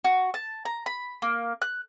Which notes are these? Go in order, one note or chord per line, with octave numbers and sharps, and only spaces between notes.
F#4
A5
A#5
B5
A#3
F#6